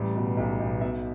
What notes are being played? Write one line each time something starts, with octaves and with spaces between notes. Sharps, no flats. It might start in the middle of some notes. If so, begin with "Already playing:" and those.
Already playing: A1 G3
B2
B1
B1
B2 E5